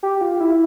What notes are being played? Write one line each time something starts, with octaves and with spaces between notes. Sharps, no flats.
G4
F4
E4